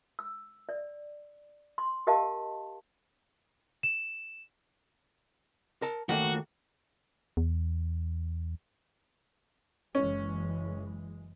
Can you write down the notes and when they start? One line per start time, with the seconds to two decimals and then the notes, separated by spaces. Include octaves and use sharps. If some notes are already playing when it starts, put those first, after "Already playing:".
0.19 E6
0.69 D5
1.78 C6
2.07 G4 A#4 D#5 F5 A5
3.83 E7
5.82 A#4 A5
6.09 D#3 A3 A#3 F#4
7.37 E2
9.95 F#1 E3 G#3 C#4